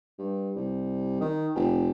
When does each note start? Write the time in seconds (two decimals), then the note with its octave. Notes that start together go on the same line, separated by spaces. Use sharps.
0.18 G2
0.56 C2
1.21 D#3
1.55 F1